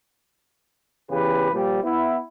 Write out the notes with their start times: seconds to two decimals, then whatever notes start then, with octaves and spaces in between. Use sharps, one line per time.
1.10 E2 C#3 G4 B4
1.53 A#2 F3 G3
1.83 B3 E4